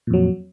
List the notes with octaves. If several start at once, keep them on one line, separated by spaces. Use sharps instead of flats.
F2 A#2 F#3